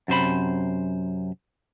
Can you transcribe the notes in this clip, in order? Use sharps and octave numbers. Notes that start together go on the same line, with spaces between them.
F#2 C3 C5 B5